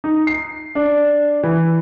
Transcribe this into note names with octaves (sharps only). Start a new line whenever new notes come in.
D#4
C7
D4
E3